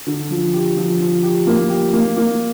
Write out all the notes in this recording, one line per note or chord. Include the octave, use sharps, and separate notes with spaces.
D3
F3
G4
F3
F3
G4
A#3
G4
A#3
A#3